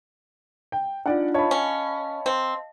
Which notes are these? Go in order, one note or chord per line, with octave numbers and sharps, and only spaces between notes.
G5
D4 D#4 F4 D5 F#5
C#5 D#5 F5 A5 B5
C#4
C4